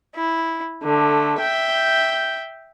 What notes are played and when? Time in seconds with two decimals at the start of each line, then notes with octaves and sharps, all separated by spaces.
0.14 E4
0.85 D3 A3
1.41 E5 G5 G6